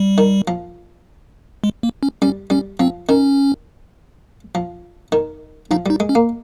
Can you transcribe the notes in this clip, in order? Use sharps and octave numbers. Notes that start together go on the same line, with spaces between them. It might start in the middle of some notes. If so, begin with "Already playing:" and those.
Already playing: G3
D#3
F3
G#3
A#3
C#4
G3 C#4
G3 C#4
F3 C4
D#3 C#4
F3
D#3
F3 D#4
G3 D#4
G#3
C#4
A#3